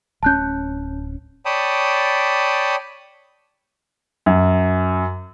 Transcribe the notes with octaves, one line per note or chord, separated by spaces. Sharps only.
D1 C#4 A5 F#6 G6
C#5 D5 G5 A5 B5 D#6
F#2